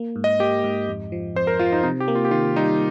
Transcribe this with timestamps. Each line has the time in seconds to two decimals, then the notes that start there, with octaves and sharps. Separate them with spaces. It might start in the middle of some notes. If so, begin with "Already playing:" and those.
Already playing: A#3
0.16 G#2
0.24 D#5
0.40 A#3 G4
0.64 G#2
0.88 F2
1.12 F3
1.36 F2 C5
1.47 A#4
1.59 F3 F4
1.72 D#4
1.83 C3 D#4
2.00 G4
2.08 A#3
2.15 F4
2.25 G4
2.31 D#3 F4
2.56 G3 D#4